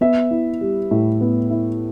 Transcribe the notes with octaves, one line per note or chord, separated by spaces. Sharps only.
B3 E5
E4
G3
A2
B3
E4